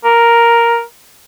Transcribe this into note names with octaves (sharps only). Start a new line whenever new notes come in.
A#4